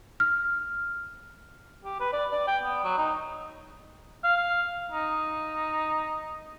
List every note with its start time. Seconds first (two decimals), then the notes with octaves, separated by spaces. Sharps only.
0.20 F6
1.85 G4
2.00 B4
2.13 D5
2.32 D5
2.48 G5
2.63 B3
2.84 F#3
2.98 D#4
4.24 F5
4.91 D#4